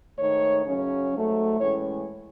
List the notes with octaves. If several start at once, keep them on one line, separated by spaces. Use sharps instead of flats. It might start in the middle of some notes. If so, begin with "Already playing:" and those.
G#2 D#3 A3 D#4 C#5
F#2 C#3 F#3 C#4
G#2 F#3 A3
A2 E3 G#3 C#4 C#5